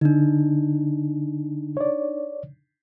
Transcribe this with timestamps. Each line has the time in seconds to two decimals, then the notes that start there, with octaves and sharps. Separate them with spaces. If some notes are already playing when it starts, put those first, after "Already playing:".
0.01 D3 D4 D#4
1.77 C#5 D5